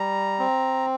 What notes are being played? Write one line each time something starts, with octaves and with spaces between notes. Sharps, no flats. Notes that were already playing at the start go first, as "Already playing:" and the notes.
Already playing: G3 A#5
C4